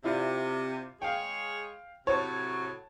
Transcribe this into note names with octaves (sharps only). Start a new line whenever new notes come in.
C3 E4 F4 D5
G#3 G#4 C#5 F5 G5
A2 C3 F#3 C#5 A5